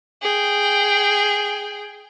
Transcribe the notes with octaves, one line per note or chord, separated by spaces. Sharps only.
G#4 G5